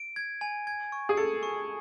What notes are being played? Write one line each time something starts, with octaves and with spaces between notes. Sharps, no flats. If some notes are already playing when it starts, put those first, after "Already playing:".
Already playing: D7
G#6
G#5
G#6
C#6
G#4
A4 C#7
C#6